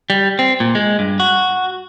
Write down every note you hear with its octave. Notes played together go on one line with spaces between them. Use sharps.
G3
C4
A#2
G#3
G2
F#4